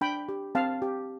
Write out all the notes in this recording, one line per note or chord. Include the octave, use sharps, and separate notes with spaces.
D4 G5 B5
G4
C4 F5 A5
G4